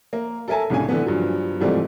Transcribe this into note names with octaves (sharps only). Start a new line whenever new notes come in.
A#3
A4 A#4 E5 G#5 A5
C2 A2 C#3 D4 G#5
D3 E3 A3 B3
G2 F3 F#3
G#2 C3 E3 F3 G3 A3